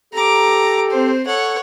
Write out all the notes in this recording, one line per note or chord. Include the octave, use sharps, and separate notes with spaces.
G4 A4 A#5 D6
C4 C5
A4 C#5 F#5